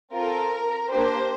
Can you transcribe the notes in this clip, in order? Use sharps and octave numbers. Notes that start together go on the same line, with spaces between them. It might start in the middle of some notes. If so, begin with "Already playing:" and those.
C4 F4 A4 A#4
A#3 D4 G4 C5